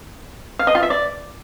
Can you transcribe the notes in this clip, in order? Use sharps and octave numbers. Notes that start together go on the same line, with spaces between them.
F5
D#5
F4
E5
D5